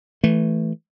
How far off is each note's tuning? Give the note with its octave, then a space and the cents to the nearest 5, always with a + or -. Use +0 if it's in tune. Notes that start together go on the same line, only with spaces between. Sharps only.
E3 +0 A3 +0